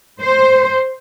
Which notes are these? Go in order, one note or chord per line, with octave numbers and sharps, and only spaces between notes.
C5